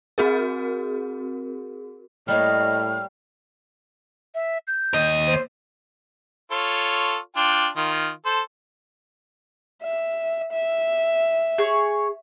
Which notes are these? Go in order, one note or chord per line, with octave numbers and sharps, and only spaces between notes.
C4 F#4 G#4 A#4
A2 G3 A#3 C#5 D#5 F6
E5
G6
D#2 D#5
C5
F4 A4 C#5
D4 F4 G5
D#3 F4
A4 C5
E5
E5
G#4 C#5